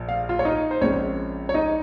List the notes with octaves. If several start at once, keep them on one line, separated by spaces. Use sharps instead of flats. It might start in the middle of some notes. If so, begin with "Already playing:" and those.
Already playing: A#1 A#2
F5
F4 F5
C#5
D#4 D#5
C5
A#1 A#2 G#3 C4 C#4 C#5
C#5
D#4 D#5